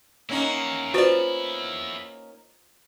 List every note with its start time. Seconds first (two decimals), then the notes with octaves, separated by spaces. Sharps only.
0.29 A#3 C#4 D#4 E4 F#5
0.94 F4 F#4 B4 C5 D5